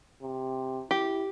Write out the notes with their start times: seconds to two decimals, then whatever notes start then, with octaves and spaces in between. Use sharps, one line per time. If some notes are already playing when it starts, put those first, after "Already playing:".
0.22 C3
0.91 E4 G4